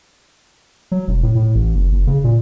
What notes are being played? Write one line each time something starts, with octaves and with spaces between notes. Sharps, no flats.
F#3
E1
A2
A2
A1
F#1
F#1
C#3
A#2